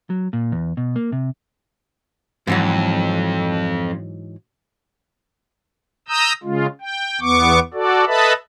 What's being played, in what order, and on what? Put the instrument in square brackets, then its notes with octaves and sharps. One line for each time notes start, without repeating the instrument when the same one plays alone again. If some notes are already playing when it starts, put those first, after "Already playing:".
[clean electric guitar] F#3
A#2
E2
B2
A#3
C3
[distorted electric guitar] F2 [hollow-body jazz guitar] G#2 E3 F#3
[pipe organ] A#5 D#6 E6 G6
C#3 G#3 F4
G5
E2 B3 C#6 D6
F#4 A4 D5
A4 B4 D#5 E5 A5 B5